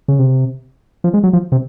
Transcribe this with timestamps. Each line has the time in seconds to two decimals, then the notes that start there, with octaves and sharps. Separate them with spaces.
0.08 C#3
0.19 C3
1.04 F3
1.14 G#3
1.24 F#3
1.33 F3
1.52 C3